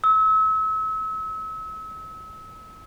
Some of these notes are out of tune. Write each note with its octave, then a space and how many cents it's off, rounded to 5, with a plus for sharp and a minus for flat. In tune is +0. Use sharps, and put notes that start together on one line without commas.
E6 -35